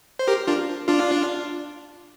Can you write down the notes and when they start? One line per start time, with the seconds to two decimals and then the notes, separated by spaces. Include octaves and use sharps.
0.19 C5
0.28 G4 A#4
0.47 D4 F4
0.88 D4 F4